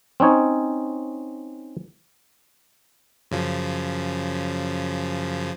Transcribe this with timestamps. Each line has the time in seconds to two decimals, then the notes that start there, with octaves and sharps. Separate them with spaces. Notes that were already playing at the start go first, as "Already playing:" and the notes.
0.20 C4 C#4 D#4 C#5
3.31 F#2 C#3 F3